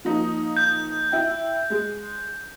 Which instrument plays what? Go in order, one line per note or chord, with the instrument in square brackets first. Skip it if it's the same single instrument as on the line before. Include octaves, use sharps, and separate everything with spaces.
[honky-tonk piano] F3 A#3 D#4
[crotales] G6
[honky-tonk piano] E4 G5
G#3